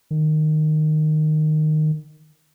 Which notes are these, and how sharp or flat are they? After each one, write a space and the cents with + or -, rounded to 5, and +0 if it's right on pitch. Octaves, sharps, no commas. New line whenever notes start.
D#3 -15